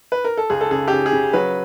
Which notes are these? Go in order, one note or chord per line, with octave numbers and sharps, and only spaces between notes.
B4
A#4
A4
C#2 G#4
A4
C#3 G#4
G4
C#3 G#4
G#4
C#3
F#3 B4